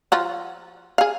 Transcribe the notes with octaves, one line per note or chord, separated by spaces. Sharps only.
F3 F4 F#4
G#4 F5